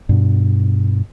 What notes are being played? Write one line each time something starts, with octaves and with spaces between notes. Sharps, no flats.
G2 B2